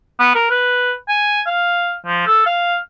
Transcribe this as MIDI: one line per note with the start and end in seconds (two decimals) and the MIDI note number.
0.19 0.34 59
0.35 0.47 70
0.51 0.94 71
1.09 1.41 80
1.46 1.95 77
2.06 2.24 53
2.27 2.45 69
2.46 2.76 77